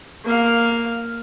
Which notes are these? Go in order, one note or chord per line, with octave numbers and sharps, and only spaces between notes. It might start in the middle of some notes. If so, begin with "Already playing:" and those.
A#3 F5